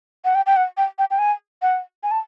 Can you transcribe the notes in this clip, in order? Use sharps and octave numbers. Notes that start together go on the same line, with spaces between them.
F#5
G5
G5
F#5
G5
G5
G5
G#5
F#5
G#5
A5